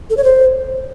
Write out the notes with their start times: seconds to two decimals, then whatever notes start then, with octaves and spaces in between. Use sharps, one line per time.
0.10 A4
0.17 C#5
0.24 C5